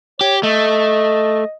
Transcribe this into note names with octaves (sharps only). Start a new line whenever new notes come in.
G4 C#5
A3 D#5